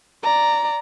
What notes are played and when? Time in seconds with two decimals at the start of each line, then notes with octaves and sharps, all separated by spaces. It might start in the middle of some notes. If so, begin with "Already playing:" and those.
0.23 D5 A#5